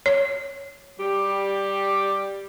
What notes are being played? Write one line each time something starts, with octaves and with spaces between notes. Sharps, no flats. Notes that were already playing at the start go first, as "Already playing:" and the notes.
C#5
G3 G4